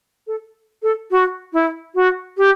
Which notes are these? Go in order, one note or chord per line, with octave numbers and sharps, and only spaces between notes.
A4
A4
F#4
E4
F#4
G4